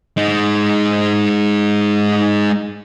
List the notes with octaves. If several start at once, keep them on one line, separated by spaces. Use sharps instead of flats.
G#3 D#4